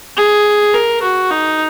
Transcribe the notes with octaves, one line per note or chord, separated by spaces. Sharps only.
G#4
A#4
F#4
D#4